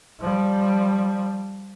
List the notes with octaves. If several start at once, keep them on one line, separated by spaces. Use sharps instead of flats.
F3 G3